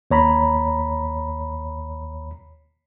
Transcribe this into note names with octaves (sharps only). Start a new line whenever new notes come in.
D#2 C#5 A#5 B5